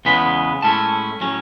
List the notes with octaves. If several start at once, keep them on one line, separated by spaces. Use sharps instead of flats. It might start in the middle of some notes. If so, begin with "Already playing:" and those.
E2 C#3 G#3 B3 B5
A2 G#3 C#4 E4 A5
A2 F#3 C#4